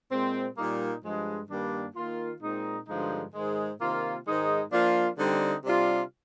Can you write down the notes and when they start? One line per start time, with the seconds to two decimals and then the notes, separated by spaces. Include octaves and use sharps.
0.12 A#2 G#3 C4
0.58 A#2 G3 A#3 D#4
1.04 G2 F3 G#3
1.50 G2 D#3 G3 A#3 D4
1.96 D#3 A#3 F4
2.41 A#2 G#3 C4 D#4
2.88 G2 D3 F3 G#3 D#4
3.34 G#2 D#3 G#3
3.80 C3 D#3 A#3 F4
4.26 G#2 D#3 G#3 D#4
4.72 F3 A#3 D4 F4
5.18 D3 G3 C4 D#4
5.65 C3 G3 D4 F4